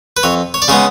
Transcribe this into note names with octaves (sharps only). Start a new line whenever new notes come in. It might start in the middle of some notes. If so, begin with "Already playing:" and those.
B4
F2 C#5
C#5
D5
C#3 G#3 B3 C#5